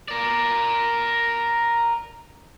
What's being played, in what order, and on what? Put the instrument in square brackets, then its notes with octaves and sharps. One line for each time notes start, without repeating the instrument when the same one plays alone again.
[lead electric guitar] A#4 D5